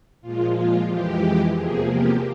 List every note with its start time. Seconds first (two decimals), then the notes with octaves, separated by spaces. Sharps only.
0.22 A#2 F3 G#3 F4
0.56 F4
0.89 F2 E3 G#3 G4
1.56 E2 C3 F3 A#3 G#4
1.90 G4